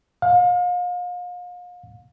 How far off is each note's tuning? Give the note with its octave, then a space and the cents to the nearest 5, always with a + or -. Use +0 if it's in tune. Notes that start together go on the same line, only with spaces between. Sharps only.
F5 +35